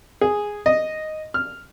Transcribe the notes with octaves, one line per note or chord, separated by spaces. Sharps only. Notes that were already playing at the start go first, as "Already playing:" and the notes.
G#4
D#5
F6